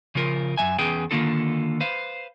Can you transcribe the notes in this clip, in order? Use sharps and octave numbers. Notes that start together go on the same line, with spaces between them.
C#3 F3 F4 A#4
F#2 E3 E5 G#5
E2 C#4 G#4 B4 G5
D3 D#3 A#3 D#4 F4 A4
B4 C5 F5